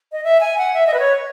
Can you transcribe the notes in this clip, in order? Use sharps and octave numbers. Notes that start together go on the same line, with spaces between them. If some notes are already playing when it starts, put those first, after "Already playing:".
D#5
E5
G#5
F#5
E5
D#5
B4
C#5